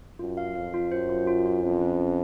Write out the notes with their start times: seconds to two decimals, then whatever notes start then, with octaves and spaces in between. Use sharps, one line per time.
0.19 F#2 F4
0.37 F5
0.55 F2 F5
0.74 F4
0.91 F#2 C5
1.10 F4
1.27 F4
1.46 F4
1.63 F2 C#4
1.81 C#4
2.00 C#4